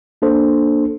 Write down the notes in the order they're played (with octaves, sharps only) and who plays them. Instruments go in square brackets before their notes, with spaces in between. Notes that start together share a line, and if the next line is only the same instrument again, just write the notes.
[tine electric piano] A#3 D4 A4 C5